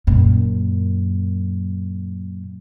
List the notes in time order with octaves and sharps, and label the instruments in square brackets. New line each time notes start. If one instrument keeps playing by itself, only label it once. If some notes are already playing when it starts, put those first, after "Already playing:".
[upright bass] F#2 A#2